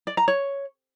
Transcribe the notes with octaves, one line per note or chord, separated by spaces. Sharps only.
D5
A#5
C#5